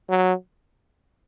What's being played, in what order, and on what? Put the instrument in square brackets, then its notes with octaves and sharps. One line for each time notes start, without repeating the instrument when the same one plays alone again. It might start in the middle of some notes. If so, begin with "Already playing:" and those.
[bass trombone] F#3